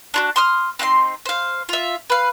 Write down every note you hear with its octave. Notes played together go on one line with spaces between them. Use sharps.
D4 F4 F#4
C6 D#6 F6
C4 D#4 F#5 C6
C5 F5
F4 E5
B4 F5